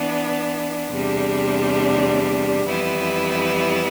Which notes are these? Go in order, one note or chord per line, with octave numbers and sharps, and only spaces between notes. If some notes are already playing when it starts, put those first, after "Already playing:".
Already playing: E3 B3 D4
E2 C3 G3 D4
F2 E3 G3 B3 E4